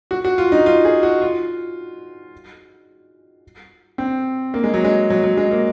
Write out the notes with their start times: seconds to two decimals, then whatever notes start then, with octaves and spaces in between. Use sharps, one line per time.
0.11 F#4
0.25 F#4
0.38 F4
0.52 D#4
0.66 F4
0.85 G#4
1.03 F#4
1.22 F4
3.98 C4
4.54 A#3
4.64 G#3
4.74 F#3
4.84 G#3
5.10 F#3
5.24 F#3
5.37 G#3
5.51 A#3